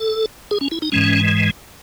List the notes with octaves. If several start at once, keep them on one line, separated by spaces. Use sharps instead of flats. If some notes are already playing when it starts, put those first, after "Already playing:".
Already playing: A4
G#4
C#4
E4
D#4
G#2 E3 G#3 C#4